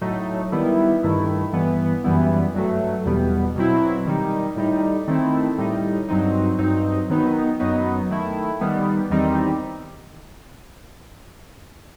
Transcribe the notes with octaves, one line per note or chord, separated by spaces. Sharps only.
A2 F#3 A3 D#4
D#3 G3 B3 E4
G2 D#3 A3 E4
G2 E3 B3
F#2 E3 G3 B3 E4
G2 F#3 A3
E2 B2 G3 B3
B2 F#3 C4 E4
D#3 G3 D#4
A2 G3 D#4
D#3 A3 C4 E4
A2 G3 D#4
G2 F#3 C4 D#4
G2 F#3 C4 D#4
D#3 F#3 B3 D#4
F#2 F#3 B3 D#4
D#3 A3 E4
D#3 G3 B3
E2 D#3 G3 C4 D#4